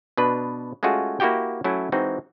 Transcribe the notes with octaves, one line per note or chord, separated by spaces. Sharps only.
B2 D4 B4
G#3 A3 C#4 F4 F#4 G#4
A#3 E4 F#4 G4 G5
F#3 A3 C#4 E4
E3 G#3 C4 D#4 F#4